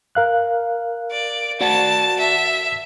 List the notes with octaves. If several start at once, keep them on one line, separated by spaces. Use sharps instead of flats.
A#4 F5 F#6
D5
F#4 D5 F#5 A5
E5